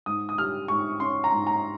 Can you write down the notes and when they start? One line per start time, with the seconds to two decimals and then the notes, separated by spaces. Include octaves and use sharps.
0.06 G#2 D#6
0.29 D#6
0.38 G3 F6
0.68 G#2 C#6
1.00 C#4 C6
1.24 A#5
1.32 G#2
1.47 A#5